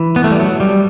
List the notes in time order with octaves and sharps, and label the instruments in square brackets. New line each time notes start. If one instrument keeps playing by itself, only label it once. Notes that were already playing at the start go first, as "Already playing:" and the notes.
Already playing: [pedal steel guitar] E3
B3
A3
G3
F#3
G3